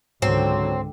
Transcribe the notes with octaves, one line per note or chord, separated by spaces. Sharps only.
C#2 G#2 D3 F#3 C4